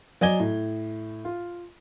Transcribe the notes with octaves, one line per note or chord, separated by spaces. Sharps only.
F#3 D5 D#5 G#5 G#6 G7
A2
F4